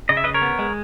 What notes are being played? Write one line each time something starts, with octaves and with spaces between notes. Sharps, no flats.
C#3 D#5
E5
C#3 B4 D#5
A#4 C#5
B3
G#3